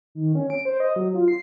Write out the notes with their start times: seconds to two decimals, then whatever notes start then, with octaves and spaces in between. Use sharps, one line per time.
0.15 D#3
0.35 C#4
0.50 D7
0.65 C5
0.80 D#5
0.96 F#3
1.15 F4
1.28 C7